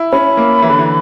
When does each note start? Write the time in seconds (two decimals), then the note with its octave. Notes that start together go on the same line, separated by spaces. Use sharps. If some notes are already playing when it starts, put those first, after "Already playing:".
Already playing: E4
0.12 C#4 B5
0.37 A#3
0.62 E3
0.70 D3
0.79 E3